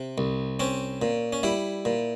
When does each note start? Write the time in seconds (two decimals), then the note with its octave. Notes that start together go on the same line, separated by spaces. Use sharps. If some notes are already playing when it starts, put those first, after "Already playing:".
Already playing: C3
0.18 C2
0.60 C4 C#4
1.02 A#2
1.33 C#4
1.43 G3 E4
1.85 A#2